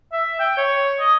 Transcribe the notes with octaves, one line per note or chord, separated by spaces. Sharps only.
E5
G5
C#5
D#5